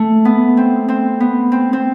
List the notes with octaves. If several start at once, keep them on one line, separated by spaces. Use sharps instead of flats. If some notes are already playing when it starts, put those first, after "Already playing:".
Already playing: A3
B3
C4
C4
B3
C4
C4